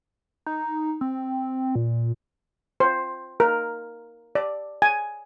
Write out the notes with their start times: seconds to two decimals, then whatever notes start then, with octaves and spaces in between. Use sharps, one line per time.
0.46 D#4
1.01 C4
1.75 A#2
2.80 C5
3.40 A#4
4.35 D5
4.82 G#5